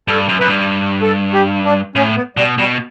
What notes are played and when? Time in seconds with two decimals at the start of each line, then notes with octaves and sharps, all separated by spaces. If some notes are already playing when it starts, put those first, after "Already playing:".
0.08 G2 A4
0.29 F#2
0.39 F#2 B4
0.49 G2
1.02 A4
1.33 G4
1.64 D4
1.96 A2 C#4
2.16 B3
2.37 B2 G3
2.58 B2 G3